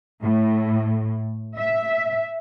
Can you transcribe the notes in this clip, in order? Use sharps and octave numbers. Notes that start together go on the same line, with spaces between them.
A2
E5